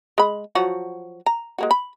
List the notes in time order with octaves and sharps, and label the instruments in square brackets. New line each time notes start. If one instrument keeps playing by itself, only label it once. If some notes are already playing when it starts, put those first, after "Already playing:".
[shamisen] G#3 B5
F3 F#3 F#4
A#5
G#3 A#3 F#4
B5